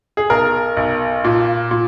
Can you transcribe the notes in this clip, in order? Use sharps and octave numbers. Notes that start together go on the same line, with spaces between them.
G#4
B1 A#4
B1
A#2
A#2